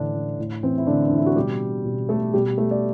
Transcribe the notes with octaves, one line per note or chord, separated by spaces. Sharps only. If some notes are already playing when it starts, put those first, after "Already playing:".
Already playing: A2 D3 E3 D4
E3
A2
E3 C4
E4
A2 D3 D4
E3 D4
E4
F#4
B2 G3 G4
B2
A3 A4
B2 G3 G4
A3 A4
D5